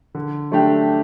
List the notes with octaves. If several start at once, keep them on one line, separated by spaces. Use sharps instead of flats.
D3
F#3 A3 D4 G4